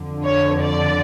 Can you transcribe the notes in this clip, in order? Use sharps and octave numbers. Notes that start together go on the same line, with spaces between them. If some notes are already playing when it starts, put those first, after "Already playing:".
Already playing: F2 D3
C#5
D5